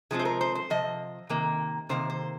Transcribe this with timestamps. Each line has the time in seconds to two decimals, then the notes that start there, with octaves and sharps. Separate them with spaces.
0.11 C3 F3 G#3 C4 G#4
0.19 C5
0.25 A#4
0.41 C5
0.55 C5
0.70 C3 F3 D#5
1.29 C3 D#3 A#3
1.89 C3 D#3 A#3 C5
2.10 C5